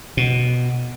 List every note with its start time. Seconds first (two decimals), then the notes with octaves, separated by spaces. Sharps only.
0.17 B2